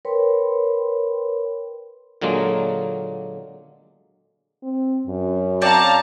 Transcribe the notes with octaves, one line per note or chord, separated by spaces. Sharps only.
A#4 B4 C#5 G5 B5 C6
A#2 D3 F#3 G#3 A#3
C4
F#2
C4 C#5 D5 F5 A5 A#5